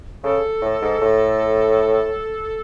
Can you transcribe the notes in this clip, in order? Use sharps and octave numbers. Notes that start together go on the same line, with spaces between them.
C#3 A4
A2
G#2
A2